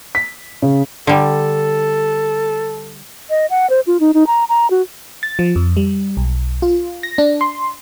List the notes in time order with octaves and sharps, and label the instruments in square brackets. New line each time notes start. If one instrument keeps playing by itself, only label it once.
[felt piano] B6
C#3
[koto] D3 G3 [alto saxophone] A4
[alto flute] D#5
F#5
C5
F4
D#4
D#4
A#5
A#5
F#4
[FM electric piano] A6
F3
F2
G3
B1
F4
A#6
D4
C6